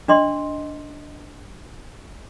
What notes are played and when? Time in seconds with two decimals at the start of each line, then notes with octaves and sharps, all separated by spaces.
0.08 D4 D#5 C6